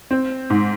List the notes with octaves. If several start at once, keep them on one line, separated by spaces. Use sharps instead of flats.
C4
G#2